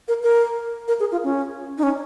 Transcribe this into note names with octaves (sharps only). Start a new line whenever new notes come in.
A#4
A#4
A#4
G#4
F4
C#4
D#4
C#4